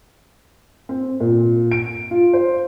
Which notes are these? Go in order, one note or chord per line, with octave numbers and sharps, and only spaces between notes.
C4
A#2
D7
F4
C5